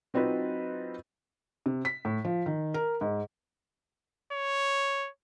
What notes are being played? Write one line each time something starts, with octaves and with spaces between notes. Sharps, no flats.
F#3 C4 D#4 F4 B4
C3
B6
A2
F3
D#3
A#4
G#2
C#5